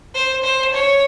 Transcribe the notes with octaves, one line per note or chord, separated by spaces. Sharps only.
C5
C5
C#5